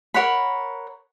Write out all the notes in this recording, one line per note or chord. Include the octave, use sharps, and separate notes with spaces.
A#4 C#5 F#5 B5